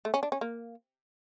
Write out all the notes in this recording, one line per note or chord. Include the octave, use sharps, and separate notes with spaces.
A3
C#4
D4
C#4
A#3